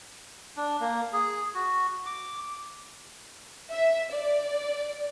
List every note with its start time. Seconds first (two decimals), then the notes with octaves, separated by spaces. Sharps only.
0.57 D4
0.81 A#3
1.13 G#4
1.54 F#4
2.06 D6
3.71 E5
4.11 D5